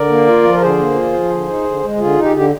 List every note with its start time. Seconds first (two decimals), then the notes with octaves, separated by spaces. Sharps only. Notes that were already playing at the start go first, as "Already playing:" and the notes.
Already playing: D3 A#4 D5
0.09 A#3
0.27 F4
0.43 F3
0.54 A#4
0.61 D3 G#4 C5
0.79 A#3
0.95 F4
1.13 F3
1.30 D3
1.48 D#4
1.64 D3
1.83 G#3
1.99 D3 F4 G#4
2.16 D#4
2.22 G4
2.34 D3 G4